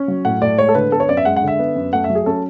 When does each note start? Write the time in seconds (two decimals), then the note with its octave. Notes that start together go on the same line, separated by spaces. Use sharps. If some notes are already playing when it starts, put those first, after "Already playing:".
Already playing: C#4
0.08 F#3
0.25 A2 F#5
0.42 A2 D5
0.58 G#3 C#5
0.69 A4
0.75 D3 B4
0.92 B3 A4
1.00 C#5
1.09 F#2 D5
1.17 E5
1.25 G#3 F#5
1.36 F#5
1.43 D3 E5
1.59 B3
1.76 F#2
1.93 A3 F#5
2.04 E5
2.10 F#3
2.15 G#4
2.26 C#4 A4